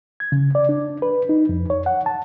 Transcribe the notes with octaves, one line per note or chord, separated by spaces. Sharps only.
G#6
C#3
D5
D4
B4
D#4
F2
C#5
F#5
A5